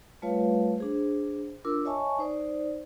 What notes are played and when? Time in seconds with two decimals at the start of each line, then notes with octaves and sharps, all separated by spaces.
0.22 G3 A3 F4 B4 C#5 F5
0.78 D4 G#4 C5
1.65 D4 F4 A#4 D6 E6
1.85 C#5 D#5 E5 G#5 A5 C#6
2.19 D#4 C5 D5